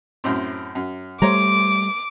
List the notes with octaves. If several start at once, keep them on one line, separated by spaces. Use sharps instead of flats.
F#2 A2 C4
F#2
G3 A3 C5 C#5 A#5 D6